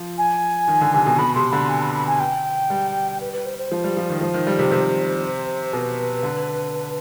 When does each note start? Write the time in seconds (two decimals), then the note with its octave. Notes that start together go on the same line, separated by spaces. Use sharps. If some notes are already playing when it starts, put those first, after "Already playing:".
Already playing: F3
0.18 G#5
0.68 D#3
0.81 D3
0.94 C3
1.06 B2
1.19 B2 B5
1.35 C3 C6
1.52 D3 B5
1.69 G#5
1.82 B5
1.94 B5
2.07 G#5
2.20 G5
2.70 G3
3.21 B4
3.33 B4
3.46 C5
3.58 C5
3.71 F3
3.84 G3
3.97 F3
4.10 D#3
4.21 F3 C5
4.34 D#3
4.47 G3
4.59 C3
4.72 C3
5.73 B2 B4
6.23 D3